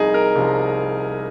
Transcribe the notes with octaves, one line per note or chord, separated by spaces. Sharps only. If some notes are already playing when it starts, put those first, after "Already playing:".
Already playing: C2 C3 F3 D#4 G#4
A#4
C2 C3 F3